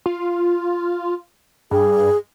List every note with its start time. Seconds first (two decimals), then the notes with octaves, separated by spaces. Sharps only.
0.06 F4
1.71 G2 G#4